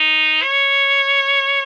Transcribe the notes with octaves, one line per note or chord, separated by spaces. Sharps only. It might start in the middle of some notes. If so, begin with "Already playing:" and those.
Already playing: D#4
C#5